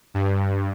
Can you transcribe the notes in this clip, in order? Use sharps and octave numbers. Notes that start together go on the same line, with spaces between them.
G2